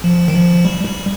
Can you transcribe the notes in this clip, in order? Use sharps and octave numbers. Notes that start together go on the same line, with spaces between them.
F3
D#3
F3
G3
G3